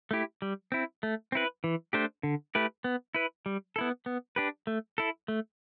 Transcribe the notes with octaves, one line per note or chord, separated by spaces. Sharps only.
A3 E4 G4
G3
C4 E4
A3
C4 E4 B4
E3
A3 D4 G4 C5
D3
A3 E4 G4 B4
B3
E4 B4
G3
B3 E4 A4
B3
D4 G4 B4
A3
E4 A4
A3